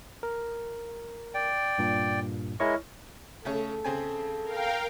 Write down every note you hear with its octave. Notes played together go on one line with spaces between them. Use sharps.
A#4
D5 G5
G2 A#2
G#3 E4 A#4 C#5 D#5 C#6
C#3 A3 C#4 A4
C#3 C4 G#5
A#4 F5 G5